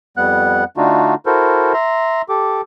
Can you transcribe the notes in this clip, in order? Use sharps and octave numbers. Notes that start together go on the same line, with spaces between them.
F2 G3 B3 F#5 F#6
D3 A3 D4 D#4 F4 F#4
E4 F#4 A4 A#4 C5
E5 A#5 C6
G4 A4 D6